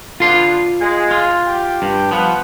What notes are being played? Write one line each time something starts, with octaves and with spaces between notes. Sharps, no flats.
D3 B3 F4 C6
G#3
F4
G4 G5
G2
F3 B3 F#5